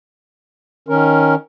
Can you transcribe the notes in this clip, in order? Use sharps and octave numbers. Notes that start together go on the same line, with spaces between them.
D#3 C#4 A#4